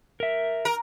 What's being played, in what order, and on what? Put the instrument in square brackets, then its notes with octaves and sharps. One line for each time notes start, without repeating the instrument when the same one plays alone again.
[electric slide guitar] A#4 E5
[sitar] A#4